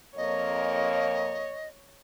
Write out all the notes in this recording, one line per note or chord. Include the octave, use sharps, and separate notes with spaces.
F2 A#3 C#5 D#5